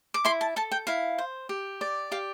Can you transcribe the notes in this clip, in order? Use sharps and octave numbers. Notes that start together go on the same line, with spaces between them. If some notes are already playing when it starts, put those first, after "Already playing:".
D6
E4 C6
A5
A4 A5
G5
E4 F5
C5
G4
D5
G4 F5